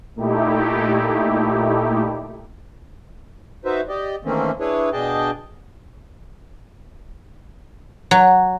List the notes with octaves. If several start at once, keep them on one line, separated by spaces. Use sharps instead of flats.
A#2 A3 D#4 E4 G4
D#4 F#4 B4 C5 E5
G4 D5 D#5
D#3 E3 A3 A#3 C4 C#4
D4 E4 G#4 B4 C#5
B2 D4 G#4 D#5 G5 A5
F#3